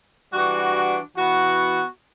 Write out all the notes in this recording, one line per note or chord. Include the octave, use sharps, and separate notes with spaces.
E3 G3 D4 F#4
E3 B3 F#4